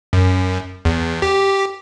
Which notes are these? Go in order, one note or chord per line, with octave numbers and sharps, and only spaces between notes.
F#2
E2
G4